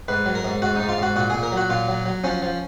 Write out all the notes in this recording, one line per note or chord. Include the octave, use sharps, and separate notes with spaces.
G#2 B4
F#3
A#4
G#2
G#2 F#4
D#4
G#2
F4
G#2 F#4
A#2 F#4
A#2 G#4
A#4
F#3
F#4
A#2 F4
F#3
F#3
F3 C#4
F3